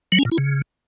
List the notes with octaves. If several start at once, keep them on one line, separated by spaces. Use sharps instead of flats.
F#3
C#4
A#2
E4
C#3